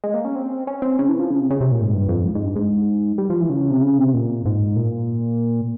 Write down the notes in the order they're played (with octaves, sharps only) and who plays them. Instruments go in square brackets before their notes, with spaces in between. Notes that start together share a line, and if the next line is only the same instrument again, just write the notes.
[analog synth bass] G#3
A#3
C#4
C4
C#4
C4
C#3
E3
F3
C#3
C3
C#3
C3
A#2
G#2
G2
F2
G#2
G#2
G2
G#2
G3
F3
E3
C#3
C3
C#3
C3
A#2
G#2
A#2